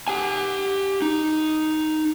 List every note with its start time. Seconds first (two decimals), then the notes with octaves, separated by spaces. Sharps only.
0.08 G4 G#5
1.02 D#4